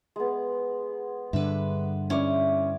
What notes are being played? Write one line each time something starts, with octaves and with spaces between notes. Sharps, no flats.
G#3 B3
G2 D3 B4 E5
C#4 E4 C#5 D5